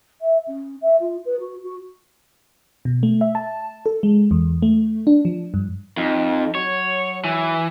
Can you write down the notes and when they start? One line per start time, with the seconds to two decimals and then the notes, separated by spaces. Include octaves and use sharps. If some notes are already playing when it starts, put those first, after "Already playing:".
0.21 E5
0.48 C#4
0.82 E5
1.00 F4
1.25 B4
1.39 F#4
1.63 F#4
2.85 B2
3.03 A3
3.21 E5
3.35 A5
3.86 A4
4.03 G#3
4.31 E2
4.62 A3
5.07 D4
5.25 F3
5.54 G2
5.97 F2 D#4
6.55 F#3 C#5
7.24 E3